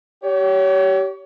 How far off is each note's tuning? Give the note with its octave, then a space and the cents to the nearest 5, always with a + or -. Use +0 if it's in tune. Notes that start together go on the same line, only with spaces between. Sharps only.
G4 -25 C#5 +25